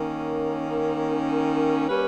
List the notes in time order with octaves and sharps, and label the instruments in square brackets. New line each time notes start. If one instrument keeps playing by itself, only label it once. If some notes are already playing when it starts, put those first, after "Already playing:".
Already playing: [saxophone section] D#3 A#3 C#4
G3 A#3 C#4 G4 B4